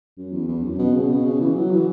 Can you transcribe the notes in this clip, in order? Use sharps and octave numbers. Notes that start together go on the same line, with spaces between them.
F#2
E2
E2
F#2
B2
C#3
B2
C#3
E3
F#3
E3